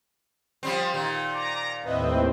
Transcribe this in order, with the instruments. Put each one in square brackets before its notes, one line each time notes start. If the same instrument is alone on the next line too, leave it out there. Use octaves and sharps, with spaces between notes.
[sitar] F3 G3 C4
A#2 D#3
[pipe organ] A#5 [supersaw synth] D6
[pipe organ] D#2 A2 C4 [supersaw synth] B4 D#5 E5